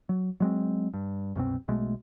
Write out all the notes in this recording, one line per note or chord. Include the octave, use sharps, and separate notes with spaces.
F#3
F#3 G#3 C4
G2
C2 F#2 B2 C4
B1 B2 G#3 A3